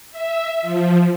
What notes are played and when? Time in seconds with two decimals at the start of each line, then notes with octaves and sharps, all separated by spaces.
0.11 E5
0.62 F3